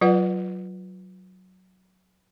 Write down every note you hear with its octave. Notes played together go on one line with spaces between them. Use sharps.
F#3 F4 B4 D5 F#5